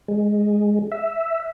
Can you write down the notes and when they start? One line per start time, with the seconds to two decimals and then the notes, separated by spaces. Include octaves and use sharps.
0.08 G#3
0.92 E5